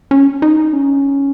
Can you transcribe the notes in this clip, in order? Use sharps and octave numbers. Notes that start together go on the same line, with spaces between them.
C#4
D#4
C#4